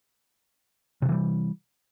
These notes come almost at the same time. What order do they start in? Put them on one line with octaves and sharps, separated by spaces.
C3 D#3 E3 G3